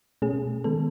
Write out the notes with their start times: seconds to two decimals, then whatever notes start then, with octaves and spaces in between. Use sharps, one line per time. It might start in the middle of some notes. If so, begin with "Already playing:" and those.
0.22 B2 A3 C#4 G#4
0.64 D#3 G#3 B3 A4